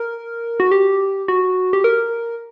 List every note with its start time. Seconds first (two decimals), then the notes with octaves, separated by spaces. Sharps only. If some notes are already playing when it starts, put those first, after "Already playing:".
Already playing: A#4
0.60 F#4
0.71 G4
1.28 F#4
1.73 G4
1.84 A#4